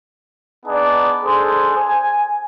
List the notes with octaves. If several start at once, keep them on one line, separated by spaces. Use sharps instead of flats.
B3 D4 D#4 G#4 D5
D4 G#4 A4 C5
G#5